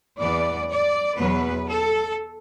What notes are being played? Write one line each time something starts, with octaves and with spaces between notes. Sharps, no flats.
E2 E3 B3 D5
D5
E2 B2 F#3 B3 B4
A4